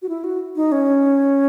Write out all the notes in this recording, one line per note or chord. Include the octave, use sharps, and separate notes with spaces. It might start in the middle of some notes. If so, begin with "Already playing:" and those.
F#4
E4
F#4
D#4
C#4